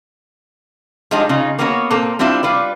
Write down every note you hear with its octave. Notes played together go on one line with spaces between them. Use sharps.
F3 G3 G#3 D4 D#4 F4
C#3 D#4 F4
A#3 B3 C#4 F#4 B4 C#5
A#2 A#3 C4 A4
G3 C4 D4 E4 F4
G3 F4 B4 D5